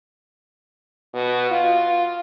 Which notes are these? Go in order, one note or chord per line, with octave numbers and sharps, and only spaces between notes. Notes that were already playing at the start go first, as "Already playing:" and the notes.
B2
F4